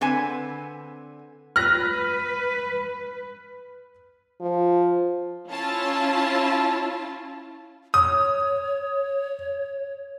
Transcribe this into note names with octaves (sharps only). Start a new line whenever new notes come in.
D3 C4 B4 G#5
B4 F6 F#6 A#6
F3
C#4 E4 F4 A5
C#5 D#6